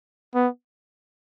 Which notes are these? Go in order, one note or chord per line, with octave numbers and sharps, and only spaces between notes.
B3